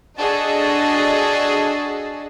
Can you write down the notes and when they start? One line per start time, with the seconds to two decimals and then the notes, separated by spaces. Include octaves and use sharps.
0.19 D4 F#4 G#4 A4 D#5 A5